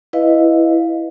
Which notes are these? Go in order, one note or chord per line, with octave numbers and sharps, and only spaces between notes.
E4 B4 D#5 F5